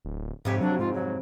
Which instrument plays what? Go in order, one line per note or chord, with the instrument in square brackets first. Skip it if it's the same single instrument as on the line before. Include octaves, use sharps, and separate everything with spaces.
[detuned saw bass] D1
[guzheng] F2 C3 C#5 [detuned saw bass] G#2 [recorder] G4
[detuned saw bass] F#3 [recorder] D4
[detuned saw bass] G#2 [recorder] F4
[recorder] F#3